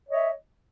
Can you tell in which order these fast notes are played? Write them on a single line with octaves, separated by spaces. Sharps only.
C#5 D#5 E5